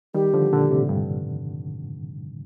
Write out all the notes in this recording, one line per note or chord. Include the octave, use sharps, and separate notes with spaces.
D#3 G3 G4
D3 F3
A#2 D3
A2 C3
G2